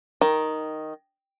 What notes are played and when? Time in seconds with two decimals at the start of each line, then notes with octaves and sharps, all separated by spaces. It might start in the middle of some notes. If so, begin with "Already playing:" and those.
0.21 D#3